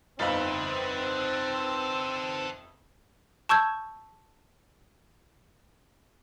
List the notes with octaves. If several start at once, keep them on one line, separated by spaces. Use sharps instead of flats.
G1 F2 C4 D#4 A4 B4 F5 F#5
A5 C#6 E6 G6 G#6